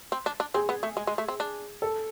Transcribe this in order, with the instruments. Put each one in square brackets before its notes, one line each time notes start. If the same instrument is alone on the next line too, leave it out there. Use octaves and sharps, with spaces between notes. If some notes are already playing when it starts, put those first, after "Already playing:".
[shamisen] C4
D4
D4
[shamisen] C4 [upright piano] G#4
[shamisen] B3
A3
G#3
G#3
A3
C4
D4
[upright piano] A4